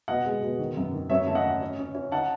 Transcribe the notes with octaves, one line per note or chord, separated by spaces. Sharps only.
B2 D#5 F#5
G#3
B2
D#3
F#2
D#3
F#2 C#5 E5
A3 E5
D#5 F#5
C#4
C#4
C#4
C#4
D#4 F#5 A5